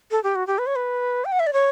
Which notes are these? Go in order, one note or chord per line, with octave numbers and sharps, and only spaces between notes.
A4
G4
F#4
G4
B4
C#5
B4
G5
F#5
E5
D5
C#5